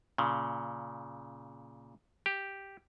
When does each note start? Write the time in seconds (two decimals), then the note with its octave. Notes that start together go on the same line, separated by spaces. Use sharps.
0.18 A#2 C#3
2.26 G4